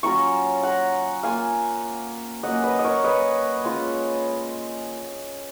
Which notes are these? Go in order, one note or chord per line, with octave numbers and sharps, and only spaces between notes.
F#3 C#4 F4 A#5 C#6
F#5 A#5
A#3 F4 F5 G#5
F#3 A#3 C#4 D#5 F#5
B4 D#5
D#5
A#4 C#5
B4 D#5
G#3 C#4 F4